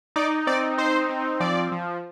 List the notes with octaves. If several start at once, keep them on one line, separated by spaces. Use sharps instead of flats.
D#4 D5
C4 D5
D#4 C5
C4
F3 D5
F3